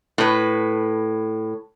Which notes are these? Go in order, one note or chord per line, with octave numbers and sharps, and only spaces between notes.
A2 B4